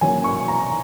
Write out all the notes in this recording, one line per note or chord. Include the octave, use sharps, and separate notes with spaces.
D#3 F#3 A#3 C#4 G#5
C#6
A#5